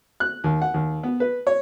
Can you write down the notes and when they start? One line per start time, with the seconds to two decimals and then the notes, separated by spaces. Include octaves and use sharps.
0.20 F#6
0.44 D#2
0.62 F#5
0.74 D#2
1.03 B3
1.20 B4
1.47 C#5